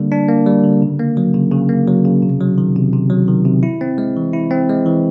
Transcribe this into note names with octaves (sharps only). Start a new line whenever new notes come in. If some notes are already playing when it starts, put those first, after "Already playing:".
Already playing: D3 G3 A#3 D4
D4
A#3
G3
D3
C#3
A#3
F#3
C#3
C#3
A#3
F#3
C#3
C3
F#3
D#3
C3
C3
F#3
D#3
C3
E4
C4
G#3
E3
E4
C4
G#3
E3